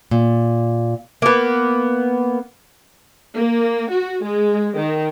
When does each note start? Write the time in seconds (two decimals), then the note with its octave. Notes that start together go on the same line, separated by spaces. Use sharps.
0.11 A#2
1.22 A#3 B3
3.35 A#3
3.90 F#4
4.24 G#3
4.76 D#3